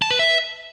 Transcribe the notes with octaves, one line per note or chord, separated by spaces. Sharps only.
A5
B4
E5